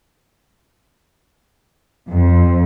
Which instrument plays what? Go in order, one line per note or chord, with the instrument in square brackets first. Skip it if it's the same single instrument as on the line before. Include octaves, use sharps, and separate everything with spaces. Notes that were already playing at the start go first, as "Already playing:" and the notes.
[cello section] F2